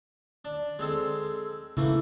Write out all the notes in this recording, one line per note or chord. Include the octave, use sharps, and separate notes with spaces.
D4
G#3 C4 A4
C#3 E3 A3 A#3 E4